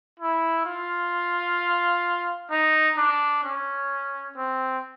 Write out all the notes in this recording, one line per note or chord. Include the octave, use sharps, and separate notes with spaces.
E4
F4
D#4
D4
C#4
C4